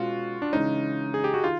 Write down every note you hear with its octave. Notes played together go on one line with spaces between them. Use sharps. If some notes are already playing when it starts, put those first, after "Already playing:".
Already playing: B2 G#3 C#4 F4 F#4
D4
C#3 E3 G#3 C#4 D#4
G#4
G4
F#4
D#3 F4